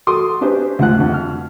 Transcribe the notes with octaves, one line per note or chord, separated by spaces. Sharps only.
F#4 A4 C6 D6 D#6
C#4 D4 G4 B4 C5
D2 G#2 F3 F#5 F#6
F2 D3
F6